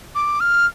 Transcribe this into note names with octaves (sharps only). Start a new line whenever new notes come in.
D6
F6